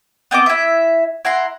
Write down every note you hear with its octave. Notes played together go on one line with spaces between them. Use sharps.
B3 C4 D#5 D6
E4 E5
E4 F#5 A#5 C6